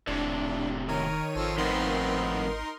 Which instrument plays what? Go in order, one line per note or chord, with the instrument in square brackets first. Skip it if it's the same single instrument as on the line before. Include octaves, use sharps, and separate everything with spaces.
[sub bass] E1 [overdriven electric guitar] A2 C3 [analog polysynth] D4
[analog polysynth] D#3 C#5 D#7 [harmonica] A#4
[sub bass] G#1 [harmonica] F3 C4 A4
[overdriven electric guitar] F2 A2 [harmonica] B3 C4 [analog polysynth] D#4 A#4 C6